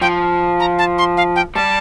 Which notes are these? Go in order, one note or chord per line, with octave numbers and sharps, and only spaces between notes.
F3 G5
A#5
A5
C6
F5
G5
G3 A5